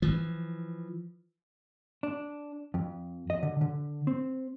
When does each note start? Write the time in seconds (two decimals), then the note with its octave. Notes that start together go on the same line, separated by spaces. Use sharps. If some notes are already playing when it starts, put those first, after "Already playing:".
0.02 E3 F3
2.03 D4
2.74 F2
3.30 D#5
3.43 D3
3.61 D3
4.07 C4